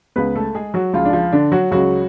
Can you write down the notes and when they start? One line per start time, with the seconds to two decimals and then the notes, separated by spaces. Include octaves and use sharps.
0.16 C#2 C#3 G#3 B3 B4
0.35 A3 A4
0.55 G#3 G#4
0.74 F#3 F#4
0.94 C#2 C#3 F3 G#3 F4
1.05 D4
1.13 F3 F4
1.32 D3 D4
1.52 F#3 F#4
1.71 C#2 C#3 F#3 G#3 F#4